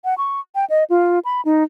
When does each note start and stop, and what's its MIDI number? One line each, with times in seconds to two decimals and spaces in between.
0.05 0.17 78
0.18 0.40 85
0.55 0.65 79
0.70 0.84 75
0.90 1.19 65
1.25 1.41 83
1.45 1.64 63